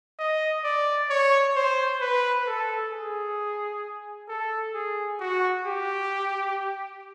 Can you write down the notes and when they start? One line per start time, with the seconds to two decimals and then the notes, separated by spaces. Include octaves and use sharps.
0.19 D#5
0.64 D5
1.10 C#5
1.56 C5
2.01 B4
2.47 A4
2.92 G#4
4.29 A4
4.74 G#4
5.20 F#4
5.66 G4